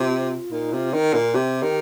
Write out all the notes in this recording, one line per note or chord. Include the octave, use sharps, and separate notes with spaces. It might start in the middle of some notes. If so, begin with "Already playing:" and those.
Already playing: C3 F4
A#2 D#4
C3 F4
D#3 D#4
A#2 F4
C3 G4
D#3